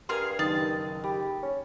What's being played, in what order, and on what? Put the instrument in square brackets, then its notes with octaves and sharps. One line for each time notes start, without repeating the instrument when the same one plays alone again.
[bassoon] G2 [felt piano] G4 A#4 C6 [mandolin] G#4 F5 G#5
[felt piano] F#1 D#3 D#6 [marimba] D#4 [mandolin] A5
[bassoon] G4 [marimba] B5
[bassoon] C#4